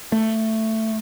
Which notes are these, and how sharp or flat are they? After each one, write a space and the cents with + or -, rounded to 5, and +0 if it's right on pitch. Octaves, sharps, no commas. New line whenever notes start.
A3 +10